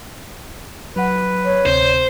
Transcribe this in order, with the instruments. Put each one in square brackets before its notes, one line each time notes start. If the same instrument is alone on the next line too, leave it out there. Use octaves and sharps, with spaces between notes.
[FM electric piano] F#3 F#5 [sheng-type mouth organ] B4
[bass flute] C#5
[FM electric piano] D2 C3 C4 [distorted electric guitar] C5 [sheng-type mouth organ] G6